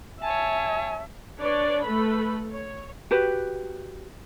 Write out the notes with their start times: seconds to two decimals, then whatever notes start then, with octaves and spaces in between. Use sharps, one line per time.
0.22 C#5 E5 G#5 A5
1.38 D4 B4 C#5 D5
1.82 A3 A4 B4 B5
2.51 C#5
3.11 F#4 G4 B4